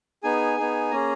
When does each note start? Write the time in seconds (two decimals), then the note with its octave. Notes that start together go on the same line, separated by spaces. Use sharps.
0.23 B3 D#4 G#4 G#5
0.57 B3 D#4 G#4
0.91 A#3 C#4 G#4 A#5